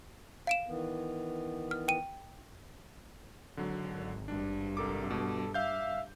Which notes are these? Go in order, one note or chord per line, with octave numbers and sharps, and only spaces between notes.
F5 D7 E7
D#3 E3 B3
F6
G5 D#7
G#1 D3 F#3
G2 D4
C2 A4 A#4 D6
B2 A4
E5 F5 G6